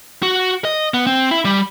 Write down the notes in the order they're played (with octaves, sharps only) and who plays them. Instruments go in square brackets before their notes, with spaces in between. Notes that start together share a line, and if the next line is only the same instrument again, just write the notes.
[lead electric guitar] F#4
D#5
B3
C4
E4
G3